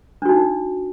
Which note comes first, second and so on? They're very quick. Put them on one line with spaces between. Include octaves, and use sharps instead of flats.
D4 F#4 D#4